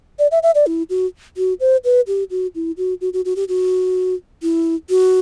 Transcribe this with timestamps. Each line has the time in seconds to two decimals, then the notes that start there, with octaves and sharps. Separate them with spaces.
0.19 D5
0.31 E5
0.43 E5
0.55 D5
0.66 E4
0.90 F#4
1.37 F#4
1.60 C5
1.84 B4
2.07 G4
2.31 F#4
2.55 E4
2.77 F#4
3.01 F#4
3.13 F#4
3.25 F#4
3.36 G4
3.48 F#4
4.42 E4
4.90 F#4